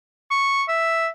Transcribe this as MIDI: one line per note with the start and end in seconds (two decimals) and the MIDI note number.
0.31 0.63 85
0.68 1.07 76